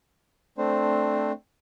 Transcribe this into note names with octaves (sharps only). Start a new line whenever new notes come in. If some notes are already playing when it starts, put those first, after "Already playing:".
A3 C4 D4 C5